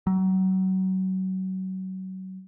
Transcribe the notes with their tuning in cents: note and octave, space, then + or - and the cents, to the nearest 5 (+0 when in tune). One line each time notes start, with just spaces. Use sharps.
F#3 +30